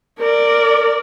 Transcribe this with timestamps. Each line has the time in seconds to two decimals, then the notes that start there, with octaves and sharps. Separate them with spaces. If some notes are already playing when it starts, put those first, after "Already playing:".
0.19 A#4 D5